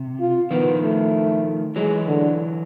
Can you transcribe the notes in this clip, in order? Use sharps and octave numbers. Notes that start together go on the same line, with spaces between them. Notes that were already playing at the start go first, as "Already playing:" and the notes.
Already playing: C3
F4
D#3 F3 B3
A3
E3 F#3 G#3
D3